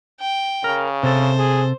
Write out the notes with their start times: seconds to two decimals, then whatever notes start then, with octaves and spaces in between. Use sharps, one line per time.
0.20 G5
0.64 C#3 A#4
1.03 C3 A4 C5
1.38 G#4